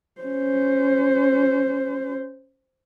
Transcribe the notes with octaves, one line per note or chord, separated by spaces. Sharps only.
C#4 C5